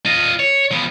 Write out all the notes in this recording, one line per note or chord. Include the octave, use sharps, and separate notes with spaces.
F4 D#5
C#5
F3 B3